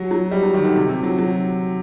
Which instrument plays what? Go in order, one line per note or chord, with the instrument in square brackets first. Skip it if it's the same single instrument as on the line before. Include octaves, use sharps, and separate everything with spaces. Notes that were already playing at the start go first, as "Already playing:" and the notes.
Already playing: [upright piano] F#3
F#3
G3
F#3
D#3
D3
C3
C3
F#3
F#3